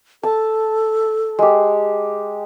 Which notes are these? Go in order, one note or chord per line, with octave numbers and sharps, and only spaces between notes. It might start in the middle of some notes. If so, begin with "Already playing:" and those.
A4 A5
G#3 G4